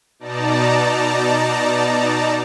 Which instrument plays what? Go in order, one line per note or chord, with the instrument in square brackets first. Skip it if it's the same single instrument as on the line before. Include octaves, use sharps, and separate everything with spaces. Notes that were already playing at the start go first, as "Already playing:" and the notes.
[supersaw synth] B2 D#4 D5 A5 A#5